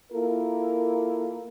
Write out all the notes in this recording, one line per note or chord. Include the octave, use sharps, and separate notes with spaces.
A#3 E4 F4 A4 A#4